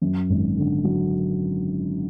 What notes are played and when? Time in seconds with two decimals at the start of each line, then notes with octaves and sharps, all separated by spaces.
0.02 F#2
0.29 G#1
0.57 D3
0.84 F#3